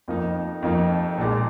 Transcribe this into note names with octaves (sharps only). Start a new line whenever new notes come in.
F2 F3 A#3 D#4
F2 F3 A#3 D#4
A#1 A#2 G#3